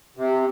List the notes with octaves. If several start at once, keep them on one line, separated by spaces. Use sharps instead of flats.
C3